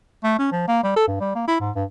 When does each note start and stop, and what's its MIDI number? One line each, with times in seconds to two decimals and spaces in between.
0.24 0.34 57
0.39 0.47 61
0.52 0.65 53
0.68 0.82 58
0.83 0.96 55
0.96 1.07 69
1.07 1.19 43
1.20 1.35 55
1.35 1.44 58
1.48 1.56 64
1.60 1.71 44
1.76 1.84 43